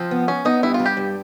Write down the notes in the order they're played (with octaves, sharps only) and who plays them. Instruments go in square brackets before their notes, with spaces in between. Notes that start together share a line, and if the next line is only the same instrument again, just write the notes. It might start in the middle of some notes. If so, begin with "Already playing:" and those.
Already playing: [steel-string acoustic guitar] F3 [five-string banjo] C4
[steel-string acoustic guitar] B3
[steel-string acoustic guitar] B3 [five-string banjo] C#4
[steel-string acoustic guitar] B3 [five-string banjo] D#4
[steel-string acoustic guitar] G2 [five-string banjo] E4
[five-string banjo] F4
[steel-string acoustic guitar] G3
[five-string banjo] G4
[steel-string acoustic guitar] G2